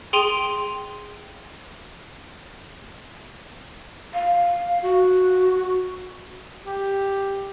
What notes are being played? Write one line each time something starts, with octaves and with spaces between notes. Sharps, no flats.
G#4 G5 C6 D#7 F7
F5
F#4
G4